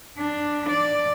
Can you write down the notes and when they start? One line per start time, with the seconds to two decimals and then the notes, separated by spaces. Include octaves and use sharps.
0.18 D4
0.69 D5